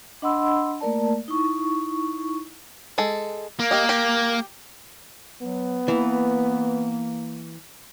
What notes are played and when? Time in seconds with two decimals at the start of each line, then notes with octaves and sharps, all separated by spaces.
0.22 D4 D#5 F#5 B5 C6 E6
0.81 A3 A#3 A#4 D5 A5
1.28 D#4 E4 C#6
2.98 G#3 A4
3.59 A#3
3.71 G4 D#5
3.89 G4
5.41 F#3 B3
5.88 E3 A#3